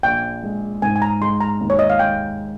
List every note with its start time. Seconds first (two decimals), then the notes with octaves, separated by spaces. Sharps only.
0.03 A#1 G5
0.43 G#3
0.82 G#2 G#5
0.96 G#5
1.02 A#5
1.21 G#3 C6
1.41 A#5
1.60 D#2
1.70 C#5
1.79 D#5
1.90 F5
1.99 G#3 G5